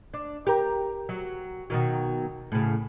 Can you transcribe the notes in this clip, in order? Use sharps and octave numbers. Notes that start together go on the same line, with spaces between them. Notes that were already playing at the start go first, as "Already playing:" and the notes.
D4
G4 A#4
F#3
B2 D#3 F#3
A2 C#3